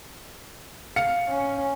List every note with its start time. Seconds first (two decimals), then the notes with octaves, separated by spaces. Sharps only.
0.96 F5 C#7
1.29 C#4